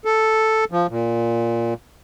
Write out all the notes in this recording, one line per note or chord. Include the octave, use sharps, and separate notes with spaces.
A4
F3
A#2